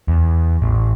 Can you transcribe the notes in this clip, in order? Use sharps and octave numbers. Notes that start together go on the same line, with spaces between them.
E2
A1